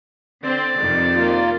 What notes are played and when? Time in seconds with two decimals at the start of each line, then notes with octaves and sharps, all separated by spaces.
0.44 D3 C4 D5
0.79 F2 C3 D#3
1.15 A#3 F4